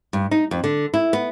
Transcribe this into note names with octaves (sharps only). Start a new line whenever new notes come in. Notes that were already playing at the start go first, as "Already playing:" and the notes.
G2
D#4
F2
D3
E4
B3